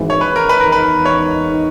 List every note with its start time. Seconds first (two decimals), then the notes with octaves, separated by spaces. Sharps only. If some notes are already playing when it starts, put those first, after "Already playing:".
Already playing: G#1 G#2 E3
0.10 C#5
0.21 B4
0.36 A#4
0.49 B4
0.60 E2 D#3 G#3 D#4 A#4
0.72 B4
1.05 C#5